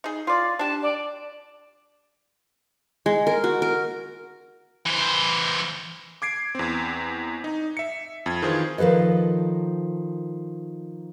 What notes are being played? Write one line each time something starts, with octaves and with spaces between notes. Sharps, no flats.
D#4 G#4
F4 D5
D4 G4 A5
D5
G#3
A#4
F#4
A#4
E3 C5
D6 G#6 C7 D7
E2 C4
D#4
E5 C#7
F2 G#6
D#3 E3 F4 G#4 C5
D#3 F3 A4 B4 D#5